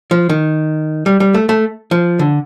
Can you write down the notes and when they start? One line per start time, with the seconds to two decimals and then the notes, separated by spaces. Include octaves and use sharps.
0.11 F3
0.29 D#3
1.06 G3
1.20 G3
1.34 A3
1.49 A3
1.91 F3
2.19 D3